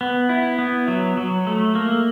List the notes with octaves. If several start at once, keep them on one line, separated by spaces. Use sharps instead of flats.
B3
E4
B3
F#3
F#3
A3
A#3